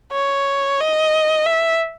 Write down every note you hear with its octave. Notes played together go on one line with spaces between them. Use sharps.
C#5
D#5
E5